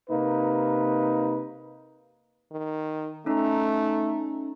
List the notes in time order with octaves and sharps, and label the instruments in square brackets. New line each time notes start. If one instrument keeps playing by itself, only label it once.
[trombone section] C3 A#3 D#4 B4
[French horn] D#3
[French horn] A3 [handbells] C#4 D#4 A#5